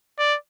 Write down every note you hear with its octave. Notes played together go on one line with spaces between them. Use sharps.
D5